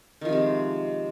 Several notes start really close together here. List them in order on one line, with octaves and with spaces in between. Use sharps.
D#3 F3 C3 G#3